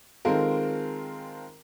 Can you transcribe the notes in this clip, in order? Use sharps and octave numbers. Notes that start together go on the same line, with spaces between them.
D#3 G#3 C4 F4 A4 A#4